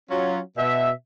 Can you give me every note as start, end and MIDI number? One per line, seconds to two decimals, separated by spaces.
0.10 0.39 54
0.10 0.39 61
0.10 0.39 65
0.58 0.90 47
0.58 0.90 76